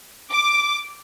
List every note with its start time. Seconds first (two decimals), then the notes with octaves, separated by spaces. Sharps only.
0.30 D6